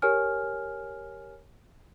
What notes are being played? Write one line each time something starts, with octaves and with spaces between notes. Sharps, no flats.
G4 A#4 C#5 G#5 F6